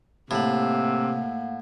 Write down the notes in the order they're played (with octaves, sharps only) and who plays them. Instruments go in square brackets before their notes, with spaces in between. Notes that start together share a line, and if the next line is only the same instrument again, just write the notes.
[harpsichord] A2 [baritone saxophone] C3 [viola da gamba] A#3 [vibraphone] F5 F#5